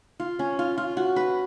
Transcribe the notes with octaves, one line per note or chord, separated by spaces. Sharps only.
F4
C#4
F4
F4
F#4
B4